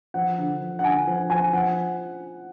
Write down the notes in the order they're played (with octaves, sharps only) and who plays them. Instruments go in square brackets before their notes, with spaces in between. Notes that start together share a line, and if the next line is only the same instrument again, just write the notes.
[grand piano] F3 F#5
D3
F3
F#5
D3 G#5
F3
F3 G#5
F3 F#5